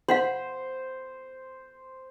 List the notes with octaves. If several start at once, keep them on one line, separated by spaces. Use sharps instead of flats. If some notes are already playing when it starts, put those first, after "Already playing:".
C5 F5 F#5 C6